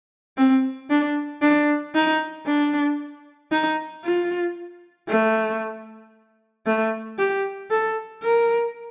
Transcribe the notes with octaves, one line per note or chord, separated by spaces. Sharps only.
C4
D4
D4
D#4
D4
D#4
F4
A3
A3
G4
A4
A#4